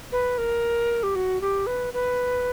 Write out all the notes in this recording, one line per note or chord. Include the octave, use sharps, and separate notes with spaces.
B4
A#4
G4
F#4
G4
B4
B4